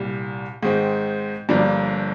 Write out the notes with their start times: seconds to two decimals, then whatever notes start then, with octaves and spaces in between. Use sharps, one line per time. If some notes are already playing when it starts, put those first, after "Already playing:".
Already playing: C2 A#2 G3
0.62 G#2 D#3 G#3 C4
1.49 G1 G2 F3 A#3 D4